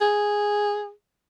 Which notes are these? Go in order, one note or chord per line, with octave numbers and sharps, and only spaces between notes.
G#4